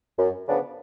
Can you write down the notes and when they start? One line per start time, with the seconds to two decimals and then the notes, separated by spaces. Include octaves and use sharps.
0.18 F#2
0.47 C#3 F3 B3 D4